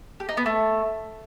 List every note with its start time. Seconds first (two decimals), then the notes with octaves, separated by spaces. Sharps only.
0.20 G4
0.29 D#4
0.37 B3
0.46 A3